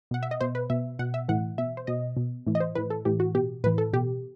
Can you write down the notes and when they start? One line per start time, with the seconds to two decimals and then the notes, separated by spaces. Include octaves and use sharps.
0.11 B2 F#5
0.23 E5
0.31 D#5
0.41 B2 C5
0.55 B4
0.70 B2 E5
0.99 B2 F#5
1.14 E5
1.29 A2 E3 F#5
1.58 B2 E5
1.77 C5
1.87 B2 D#5
2.17 B2
2.47 A2 E3
2.55 D#5
2.60 C5
2.75 A2 E3 B4
2.90 A4
3.05 A2 E3 G4
3.20 F#4
3.35 B2 G4
3.64 A2 B4
3.67 E3
3.78 A4
3.93 B2 G4